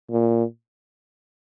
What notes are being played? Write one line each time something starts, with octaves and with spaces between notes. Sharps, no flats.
A#2